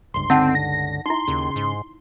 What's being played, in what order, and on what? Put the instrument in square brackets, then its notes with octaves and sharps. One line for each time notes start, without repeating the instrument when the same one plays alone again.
[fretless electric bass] G1 C#2 G2 [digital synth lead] C6
[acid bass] D3 [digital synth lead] C4 [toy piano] D#4 F#5 A5
[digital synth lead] A#6
[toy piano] D#4 E4 [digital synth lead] C6
[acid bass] D#2 [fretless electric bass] C#3
[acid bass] G#2